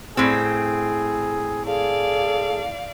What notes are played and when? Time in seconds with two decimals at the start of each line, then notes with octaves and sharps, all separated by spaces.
0.17 A2 C4 G#4
1.66 G#4 A4 D5 F5